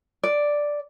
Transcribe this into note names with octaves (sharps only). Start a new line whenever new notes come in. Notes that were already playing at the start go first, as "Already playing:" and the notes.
D5